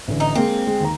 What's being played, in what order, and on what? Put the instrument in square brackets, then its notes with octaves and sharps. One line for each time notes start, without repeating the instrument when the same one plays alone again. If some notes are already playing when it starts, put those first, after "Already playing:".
[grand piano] A1 D3
[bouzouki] D#4
[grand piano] G#3 A#3 [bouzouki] C4
[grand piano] G#3
D#2 A#5